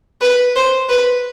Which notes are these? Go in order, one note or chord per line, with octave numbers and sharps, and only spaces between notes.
B4
C5
B4